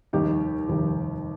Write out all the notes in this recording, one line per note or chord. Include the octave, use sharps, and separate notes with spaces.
F1 D#2 D#3 G3 D#4 G4
F1 D#2 D#3 G3